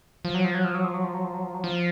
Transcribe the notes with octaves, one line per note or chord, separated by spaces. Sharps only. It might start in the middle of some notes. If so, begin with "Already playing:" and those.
F3
F#3
F3
F#3
F3
F#3
F3
F#3
F3
F#3
F3
F#3
F3
F#3
F3